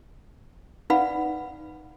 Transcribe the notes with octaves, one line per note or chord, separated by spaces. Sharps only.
D#4 B4 D5 F5 F#5 B5